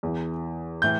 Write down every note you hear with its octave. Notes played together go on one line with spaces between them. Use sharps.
E2 E3
A2 E3 G6